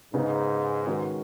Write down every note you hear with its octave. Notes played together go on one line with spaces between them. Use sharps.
G#2 C#3 B3 D#4
D#3 G#3 C#4 F#4 B4